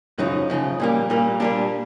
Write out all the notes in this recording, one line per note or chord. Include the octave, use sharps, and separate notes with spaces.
F#2 C#3 F3 D#4
F#2 C#3 F3
A#2 G3 A#3
A#2 G3 A#3
A#2 G3 A#3 D4